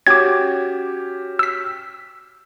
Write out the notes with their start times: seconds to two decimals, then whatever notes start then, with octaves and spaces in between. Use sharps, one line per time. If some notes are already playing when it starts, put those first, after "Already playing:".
0.07 C#4 F#4 G4 D6 G#6
1.39 E6 B6